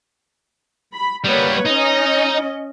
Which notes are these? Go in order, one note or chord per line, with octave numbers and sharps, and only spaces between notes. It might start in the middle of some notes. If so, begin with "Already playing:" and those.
B5
G3 A#3 B3 B4 C#5
C#4 D#4 D#5